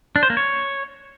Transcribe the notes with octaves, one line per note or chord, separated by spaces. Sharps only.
D4
C5
A#3
C#5